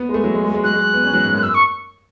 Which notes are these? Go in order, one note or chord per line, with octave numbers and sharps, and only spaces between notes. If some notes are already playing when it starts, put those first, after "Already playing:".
Already playing: B3
G#3
A3
F#3
G#3
G#3
G#3
F#3 F#6
G#3
B3
C#4
F#3
G#2
F#2
E6
C#6